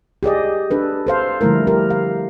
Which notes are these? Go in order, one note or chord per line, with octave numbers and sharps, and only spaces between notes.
G4 G#4 D5 D#5
D4 A4 B4
A4 C5 F5
D3 F3 G3 A3 E4 A#4
G4 A#4
F5